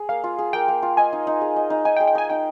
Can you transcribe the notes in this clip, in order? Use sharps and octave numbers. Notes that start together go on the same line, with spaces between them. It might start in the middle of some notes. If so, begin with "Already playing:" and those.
Already playing: G#4
A#3 F5
F4
G#4
A#3 G5
A#3
F4
D#5 G#5
D#4
D#4
G#4
D#5
D#4
D#4 G#5
G5
G#4
G5
D#5 G#5
D#4 G5